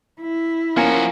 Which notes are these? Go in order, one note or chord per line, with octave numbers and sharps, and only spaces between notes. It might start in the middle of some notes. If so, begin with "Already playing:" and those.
E4
F3 A#3 C#4 F#4 A#4 F5 G#5 A#5